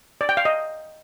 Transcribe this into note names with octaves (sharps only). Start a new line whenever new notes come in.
D5
G5
F5
D#5